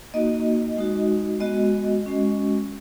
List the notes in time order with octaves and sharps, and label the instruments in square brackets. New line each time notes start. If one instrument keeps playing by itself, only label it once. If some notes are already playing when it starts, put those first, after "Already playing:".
[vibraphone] A#3 D#4 F#4 D#5
G#3 D#4 F#4
G#3 B3 F#4 D#5
G#3 C#4 F#4